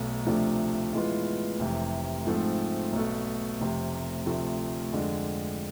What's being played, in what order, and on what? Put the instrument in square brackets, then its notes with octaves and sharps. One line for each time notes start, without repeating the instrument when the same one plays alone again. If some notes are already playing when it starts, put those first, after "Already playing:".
Already playing: [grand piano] B1 B2 A3
D2 C3 F3 A3 D4
A2 E3 G#3 B3 F4
F1 F2 C3 E3
G#2 F3 A3 C4
B1 B2 A3
F1 F2 C3
D2 C3 F3 A3
F2 D3 G#3